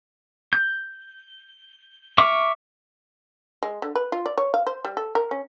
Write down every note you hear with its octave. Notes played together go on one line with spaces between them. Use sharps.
G6
E5 C#6 D6 F6
G#3
D3
B4
F4
D5
C#5
F5
C5
G3
A4
A#4
C#4